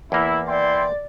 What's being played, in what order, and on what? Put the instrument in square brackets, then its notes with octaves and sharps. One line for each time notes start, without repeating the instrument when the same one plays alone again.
[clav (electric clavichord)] E2 A#3 [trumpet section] E4
[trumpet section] E4 G5 C6 [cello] D5